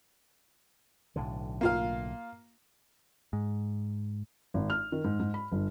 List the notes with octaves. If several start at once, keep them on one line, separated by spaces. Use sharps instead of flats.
B1 A2 D3
A#3 F4 F5
G#2
G#1
F6
D#3
G#2
G#2
B5
G1